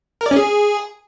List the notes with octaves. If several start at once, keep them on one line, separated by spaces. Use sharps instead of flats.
A#4
D5
C#4
G#4